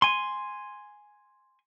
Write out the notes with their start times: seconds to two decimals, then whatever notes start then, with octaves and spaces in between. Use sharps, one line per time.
0.02 G#5 C6